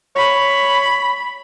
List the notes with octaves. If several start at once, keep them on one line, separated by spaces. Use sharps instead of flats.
C#5 B5